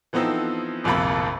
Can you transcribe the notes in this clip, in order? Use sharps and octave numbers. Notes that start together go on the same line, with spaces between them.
E3 F3 B3 C4 D#4 A4
D1 A#1 F2 C3 A#3 B5